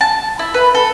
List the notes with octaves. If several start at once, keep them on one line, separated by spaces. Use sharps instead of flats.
A5
E4
B4
A4